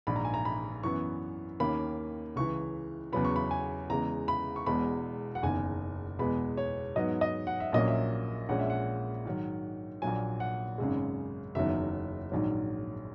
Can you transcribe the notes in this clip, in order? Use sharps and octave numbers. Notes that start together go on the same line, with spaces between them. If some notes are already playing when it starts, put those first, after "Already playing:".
A#1 G#2 D#3 B5
A#5
G#5
A#5
B5
F#2 E3 B3 C#6
D#2 D#3 A#3 C#4 B5
C#2 C#3 E3 C#6
E2 C#3 F#3 B3 B5
C#6
B5
G#5
E2 C#3 G#3 A#5
B5
C#6
E1 E2 B2 G#3 B5
F#5
F#1 E2 D#3 G#5
E2 B2 G#3 B3 B5
C#5
G#2 F#3 B3 D#5
D#5
F#5
E5
A#1 A#2 F#3 A#3 C#4 D#5
E5
A#1 A#2 G#3 C#4 F#5
E5
F#5
G#2 D#3 F#3
A#1 A#2 F#3 G#5
F#5
G#1 F#2 C#3 G#3
F#1 E2 D#3 F#3 E5
A#1 G#2 D#3 F#3